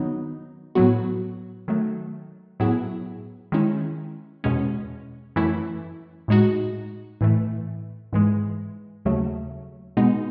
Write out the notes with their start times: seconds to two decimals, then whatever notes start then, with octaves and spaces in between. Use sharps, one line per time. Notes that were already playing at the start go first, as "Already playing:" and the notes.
Already playing: D#3 F#3 B3 D#4
0.75 A2 F#3 B3 F#4
1.68 D#3 F#3 A3
2.60 A2 F#3 B3 E4 G#4
3.52 D#3 G#3 C#4 E4
4.44 E2 B2 G#3 C#4
5.36 F#2 E3 A3 E4
6.28 A2 G#3 D#4 F#4
7.21 A2 E3 A3
8.13 G#2 E3 G#3
9.05 D#2 C#3 F#3 A3
9.97 B2 G#3 B3 D#4